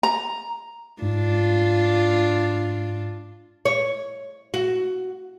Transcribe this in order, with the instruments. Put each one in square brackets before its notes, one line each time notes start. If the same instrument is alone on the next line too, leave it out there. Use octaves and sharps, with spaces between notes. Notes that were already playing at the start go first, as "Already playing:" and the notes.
[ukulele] A#5
[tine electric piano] G#2 [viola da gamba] D4 F4
[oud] C#5
F#4